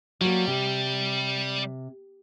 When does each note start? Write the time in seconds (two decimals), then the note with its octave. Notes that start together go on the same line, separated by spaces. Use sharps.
0.21 F#3 G3 A#3
0.47 C3